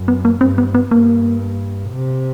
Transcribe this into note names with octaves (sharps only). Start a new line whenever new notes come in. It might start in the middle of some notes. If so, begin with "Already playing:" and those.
Already playing: F#2
B3
A#3
G2 C4
B3
B3
G2 A#3
C3